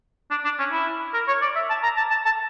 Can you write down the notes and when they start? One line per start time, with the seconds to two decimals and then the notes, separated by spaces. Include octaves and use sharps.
0.31 D4
0.45 D4
0.59 C#4
0.72 E4
1.14 A#4
1.28 C#5
1.42 D5
1.56 E5
1.70 A5
1.83 A#5
1.97 A5
2.11 A5
2.25 A5